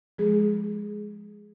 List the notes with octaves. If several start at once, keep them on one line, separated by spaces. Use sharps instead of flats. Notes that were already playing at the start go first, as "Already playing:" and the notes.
F3 G#3 G#4